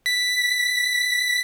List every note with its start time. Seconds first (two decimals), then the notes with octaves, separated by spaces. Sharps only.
0.06 B6